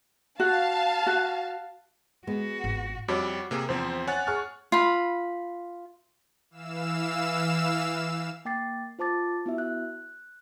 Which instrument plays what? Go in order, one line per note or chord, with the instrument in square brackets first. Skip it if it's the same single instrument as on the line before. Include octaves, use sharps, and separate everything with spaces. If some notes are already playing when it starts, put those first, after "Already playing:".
[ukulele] F#4 [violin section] F5 A5
[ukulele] F#4
[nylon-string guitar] G#3 B3 [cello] F#4
[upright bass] G#1
[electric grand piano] F2 G3 D6 [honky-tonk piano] F#4 C#5
[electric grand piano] C3 A#3 G#4
[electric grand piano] E2 F3 C4 [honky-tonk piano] C5
[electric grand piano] C#5 F#5 G#5 [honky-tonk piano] F#6 A6
[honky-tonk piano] G#4 C#6 F6
[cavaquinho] F4 B5
[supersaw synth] E3 F5 E6 E7
[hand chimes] A#3 G5 D6 A6 C7
F4 C5 A5 D6 A6
B3 E4 F#4 E5
F#6